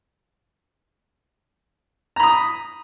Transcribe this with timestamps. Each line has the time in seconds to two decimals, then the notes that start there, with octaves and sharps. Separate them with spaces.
2.16 A#5
2.20 B5
2.23 D#6